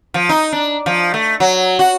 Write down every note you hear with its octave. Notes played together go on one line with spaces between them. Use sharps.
F3
D#4
D4
F3
A3
F#3
F#4